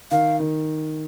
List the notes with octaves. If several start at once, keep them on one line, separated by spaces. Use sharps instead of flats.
D#3 F5
D#3